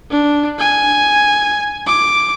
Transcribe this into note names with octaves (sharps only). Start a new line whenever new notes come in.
D4
G#5
D6